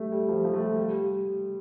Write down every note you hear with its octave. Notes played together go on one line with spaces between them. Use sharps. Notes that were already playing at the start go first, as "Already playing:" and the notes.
Already playing: G3 A3
G3
F3
F3
A3
G3
G3